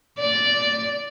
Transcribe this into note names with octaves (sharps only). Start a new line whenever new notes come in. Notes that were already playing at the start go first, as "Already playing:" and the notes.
D5